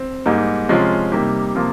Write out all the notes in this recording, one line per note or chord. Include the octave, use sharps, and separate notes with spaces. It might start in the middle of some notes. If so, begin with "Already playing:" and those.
Already playing: C4
G#2 G3 A#3 D#4
C3 F3 G#3 C#4 F4
C3 G3 A#3 D#4 G4
C3 F3 A#3 F4